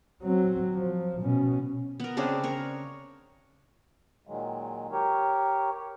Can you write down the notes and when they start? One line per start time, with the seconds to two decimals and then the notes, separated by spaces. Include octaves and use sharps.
0.23 F#3 C4
0.73 F3
1.21 B2 C#4
2.00 B3 A#4
2.17 C#3 C4 D4 G#4
2.44 A#4 C#5
4.27 A#2 D#3 F#3 G#3
4.92 G4 A#4 C#5